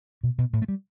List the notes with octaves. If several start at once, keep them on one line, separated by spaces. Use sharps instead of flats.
B2
B2
A2
A3
G3